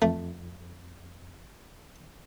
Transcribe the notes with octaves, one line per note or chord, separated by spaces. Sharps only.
F2 A3